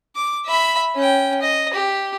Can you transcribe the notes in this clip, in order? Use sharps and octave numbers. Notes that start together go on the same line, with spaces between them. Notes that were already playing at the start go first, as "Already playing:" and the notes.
D6
E5 B5
C#4 G5
D#5
G4